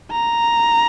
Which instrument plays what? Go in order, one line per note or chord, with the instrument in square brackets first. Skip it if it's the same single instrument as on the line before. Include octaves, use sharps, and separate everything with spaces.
[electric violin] A#5